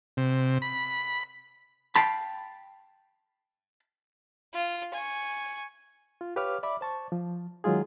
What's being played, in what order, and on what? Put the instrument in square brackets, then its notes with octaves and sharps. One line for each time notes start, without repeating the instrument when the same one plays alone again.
[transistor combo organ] C3
B5
[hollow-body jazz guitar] F5 G5 A5 B5
[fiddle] F4
G#5 C#6
[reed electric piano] F4
G4 B4 C#5 F5 D6 F6
D5 E5 B5 D6
C5 A5 C#6
F3
D#3 F#3 G#3 F4 G#4